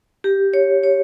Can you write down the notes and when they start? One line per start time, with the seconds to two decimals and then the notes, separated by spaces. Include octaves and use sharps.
0.24 G4
0.54 C#5
0.83 C#5